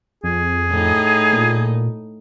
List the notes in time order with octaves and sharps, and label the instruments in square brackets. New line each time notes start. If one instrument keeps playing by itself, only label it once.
[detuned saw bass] F2 [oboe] G#4
[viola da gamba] A2 D#4
[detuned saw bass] A#2